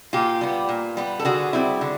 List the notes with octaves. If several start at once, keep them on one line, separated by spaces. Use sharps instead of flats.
A#2 F4 G4
G3 B3
A#2
G3 B3
A4
D3 F#4 G#4
G3 C4 E4
D3